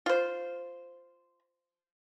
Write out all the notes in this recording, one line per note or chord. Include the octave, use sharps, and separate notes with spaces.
F4 C5